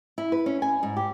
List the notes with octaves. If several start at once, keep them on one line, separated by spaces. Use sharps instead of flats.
E4
B4
C#4
G#5
G#2
G4